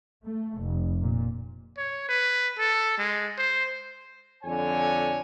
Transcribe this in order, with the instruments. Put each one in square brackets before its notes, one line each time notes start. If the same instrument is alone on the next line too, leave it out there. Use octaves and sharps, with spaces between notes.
[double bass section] A3
F1
A#2
[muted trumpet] C#5
B4
A4
G#3
C5
[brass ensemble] F2 D3 C#5 G#5